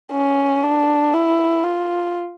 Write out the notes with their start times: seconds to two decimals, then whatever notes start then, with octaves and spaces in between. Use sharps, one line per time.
0.12 C#4
0.63 D4
1.13 E4
1.63 F4